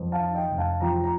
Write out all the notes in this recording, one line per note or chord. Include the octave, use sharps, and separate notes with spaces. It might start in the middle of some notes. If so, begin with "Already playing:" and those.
Already playing: F2
F5 A5
D#3
D#5 G5
F1
F5 A5
F3 G5 A#5
A#5